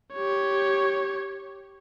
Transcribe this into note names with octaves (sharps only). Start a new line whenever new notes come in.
G4 C#5